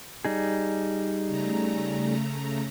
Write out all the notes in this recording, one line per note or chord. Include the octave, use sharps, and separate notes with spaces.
G3 D#4 G#4
C#3 A3 A#5